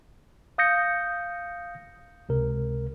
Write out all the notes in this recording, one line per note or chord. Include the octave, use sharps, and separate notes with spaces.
F5 D#6 G6 A#6 C#7
C#2 C3 A#4